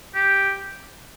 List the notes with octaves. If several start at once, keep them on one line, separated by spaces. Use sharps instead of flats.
G4